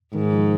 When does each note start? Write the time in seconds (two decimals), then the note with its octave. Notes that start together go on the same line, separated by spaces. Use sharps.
0.14 G#2 D#3
0.33 F3